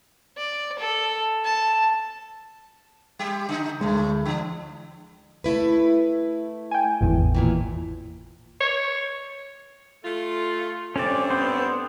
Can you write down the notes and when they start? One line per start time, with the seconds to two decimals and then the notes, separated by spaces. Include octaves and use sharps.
0.37 D5
0.79 A4
1.45 A5
3.19 G3 G4
3.49 C#3 D#4
3.81 D2 A2 G#3 A3
4.25 E3 D4
5.44 A3 E4 B4
6.71 G5 G#5
7.01 G#1 E2 A2
7.35 D#2 A#2 E3
8.60 C#5
10.04 A3 F4
10.96 G2 A3 C4 C#4 D5
11.30 B3 C5